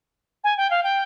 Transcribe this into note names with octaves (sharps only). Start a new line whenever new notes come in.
G#5
G5
F5
G5